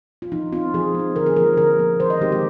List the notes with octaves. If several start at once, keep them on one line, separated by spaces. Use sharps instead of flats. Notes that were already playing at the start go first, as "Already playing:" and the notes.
F4
F3 D#4
C4 D#4 F4
F3 G#4
C4 D#4
D3 A#4
G#4
F3 A#3 A#4
D3 A#4
F3 A#3
D#3 C5
D#5
G#3 C4 D#4 G4
G4